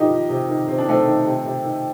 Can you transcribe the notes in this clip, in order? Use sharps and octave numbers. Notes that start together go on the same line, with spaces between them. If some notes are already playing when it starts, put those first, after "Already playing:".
Already playing: F3 D#4 G4
D#3
C3
D#3
C3 C4
D4
D#3 A3 C4
D#3
C3
C3
D#3